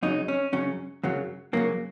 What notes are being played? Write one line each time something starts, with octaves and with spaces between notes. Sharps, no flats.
F#2 C#3 F#3 D#4
C#4
F#2 C#3 F#3 C#4
F#2 C#3 F#3
F#2 C#3 F#3 A#3